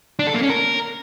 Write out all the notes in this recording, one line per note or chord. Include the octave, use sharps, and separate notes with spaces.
D4
A4
A#3
C#4
A#4